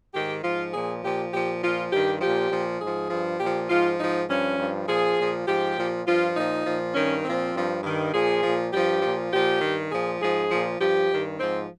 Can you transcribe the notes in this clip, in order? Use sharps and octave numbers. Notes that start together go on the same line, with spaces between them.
G#2 D#3 G4
G#2 F3 F4
A#2 F3 G#4
A#2 F3 G4
A#2 F3 G4
A#2 F3 F4
G2 D#3 G4
A#2 F3 G4
A#2 F3
G#2 F3 G#4
G2 F3
A#2 F3 G4
G#2 F3 F4
G#2 F3 D#4
G2 F3 C#4
G2 F3
A#2 F3 G#4
A#2
F3
G#2 F3 G4
A#2 F3
G2 F3 F4
A#2 F3 D#4
A#2 F3
G2 D#3 C#4
A#2 F3 C4
G2 F3
G2 D#3
A#2 F3 G#4
A#2 F3
G2 F3 G4
A#2 F3
A#2 F3 G4
G2 D#3
A#2 F3 G#4
G#2 F3 G#4
A#2 F3
G2 F3 G4
G2 D#3
G#2 F3 C4